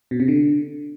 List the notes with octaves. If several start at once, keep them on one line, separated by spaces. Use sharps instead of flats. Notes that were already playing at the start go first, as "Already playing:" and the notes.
B2
C3
D3